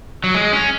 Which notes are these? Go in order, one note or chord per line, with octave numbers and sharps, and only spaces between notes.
F#3
G#3
C#4